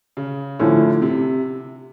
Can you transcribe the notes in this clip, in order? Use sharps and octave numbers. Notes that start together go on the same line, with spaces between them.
C#3
A2 D3 F3 A3 C#4 E4
C3